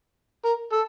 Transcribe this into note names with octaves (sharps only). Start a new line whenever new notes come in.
A#4
A4